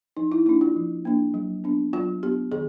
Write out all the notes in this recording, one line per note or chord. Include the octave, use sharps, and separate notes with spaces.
F3 D#4
E4
A#3 D4 E4
F4
F3
A#3 D4
F#3
B3 D4
F#3 F4
B3 D4 G4
D#3 G#4